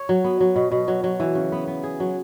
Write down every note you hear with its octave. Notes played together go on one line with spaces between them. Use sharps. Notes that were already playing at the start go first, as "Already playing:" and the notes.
Already playing: C#5
F#3
B3
F#3
B2
B2
F#3
F#3
E3
C#3
B3
B3
G#4
F#3